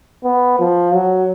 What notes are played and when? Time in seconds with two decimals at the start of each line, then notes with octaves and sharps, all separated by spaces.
0.24 B3
0.59 F3
0.94 F#3